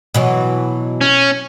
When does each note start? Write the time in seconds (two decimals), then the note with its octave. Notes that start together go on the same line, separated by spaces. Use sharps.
0.14 B2 E3 F#3
1.01 C#4